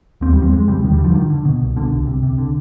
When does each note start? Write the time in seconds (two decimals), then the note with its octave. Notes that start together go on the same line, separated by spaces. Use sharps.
0.21 D#2 C4
0.33 G3
0.37 D#2
0.42 C4
0.52 F2 G#3
0.68 C3 G3
0.84 D#2 D#3
0.93 G3
0.99 D3
1.04 F3
1.14 D3 D#3
1.30 D3
1.45 B2
1.62 C2
1.76 B2 D3
1.92 C2
2.07 C3
2.23 C3
2.38 D3